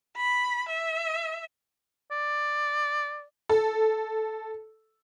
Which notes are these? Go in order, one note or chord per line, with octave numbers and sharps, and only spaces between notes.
B5
E5
D5
A4